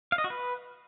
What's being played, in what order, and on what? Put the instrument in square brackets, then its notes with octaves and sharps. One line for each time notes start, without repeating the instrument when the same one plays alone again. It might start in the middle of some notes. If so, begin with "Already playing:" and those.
[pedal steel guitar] F5
D#5
F#4
B4